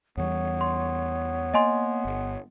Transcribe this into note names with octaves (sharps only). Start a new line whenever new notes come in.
E2 E3 G3 B3 C#5
C6
A#3 D#5 G#5 C6
G1